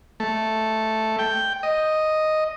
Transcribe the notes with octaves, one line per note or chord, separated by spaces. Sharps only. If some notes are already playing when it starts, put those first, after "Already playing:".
A3
G5
D#5